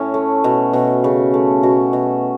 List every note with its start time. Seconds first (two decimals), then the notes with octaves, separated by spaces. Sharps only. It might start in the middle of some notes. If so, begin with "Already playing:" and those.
Already playing: A2 C#4
0.14 A3
0.44 B2
0.73 B2
1.04 C#3
1.34 A3
1.63 B2 F#4
1.93 B2